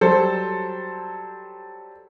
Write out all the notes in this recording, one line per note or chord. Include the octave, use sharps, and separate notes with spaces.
F#3 G3 A4 C5